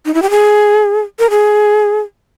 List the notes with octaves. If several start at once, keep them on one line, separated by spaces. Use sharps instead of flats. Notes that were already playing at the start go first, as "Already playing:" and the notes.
D#4
E4
G4
G#4
A#4
G#4